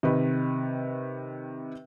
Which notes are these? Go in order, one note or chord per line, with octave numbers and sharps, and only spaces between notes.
C3 D#3 B4